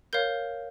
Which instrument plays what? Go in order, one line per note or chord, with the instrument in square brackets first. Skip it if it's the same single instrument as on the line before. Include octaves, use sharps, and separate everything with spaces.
[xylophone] A#4 C#5 F5 G6